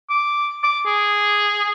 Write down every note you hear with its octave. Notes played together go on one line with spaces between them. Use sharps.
D6
D6
G#4